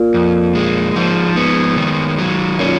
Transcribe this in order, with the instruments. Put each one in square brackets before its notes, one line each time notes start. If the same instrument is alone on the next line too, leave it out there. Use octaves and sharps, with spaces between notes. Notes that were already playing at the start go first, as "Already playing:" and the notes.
Already playing: [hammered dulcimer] A#2
[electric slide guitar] F2
G#3
[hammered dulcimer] G#2 [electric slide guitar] F3
[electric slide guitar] B3
D#3
F#3
[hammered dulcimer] A#2 [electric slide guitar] C#4